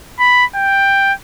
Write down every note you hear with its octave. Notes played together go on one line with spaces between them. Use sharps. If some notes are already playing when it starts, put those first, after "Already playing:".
B5
G5